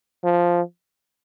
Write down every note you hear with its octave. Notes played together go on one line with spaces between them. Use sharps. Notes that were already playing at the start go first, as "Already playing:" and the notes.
F3